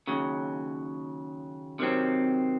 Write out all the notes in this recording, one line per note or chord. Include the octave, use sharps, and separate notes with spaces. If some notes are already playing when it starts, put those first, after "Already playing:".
D#2 C#3 F#3
C3 D#3 F#3 C4